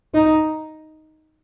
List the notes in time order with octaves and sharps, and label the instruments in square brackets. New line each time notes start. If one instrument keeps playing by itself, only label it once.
[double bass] D#4